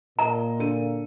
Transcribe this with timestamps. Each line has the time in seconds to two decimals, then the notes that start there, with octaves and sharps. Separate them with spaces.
0.19 A#2 D#5 A#5
0.59 D3 A4 D#7